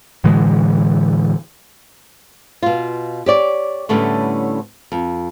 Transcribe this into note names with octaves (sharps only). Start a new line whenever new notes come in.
A2 D3 E3 G#3
B2 F4
G4 C#5 D5
A2 D3 G3 A3 B3 C#4
F2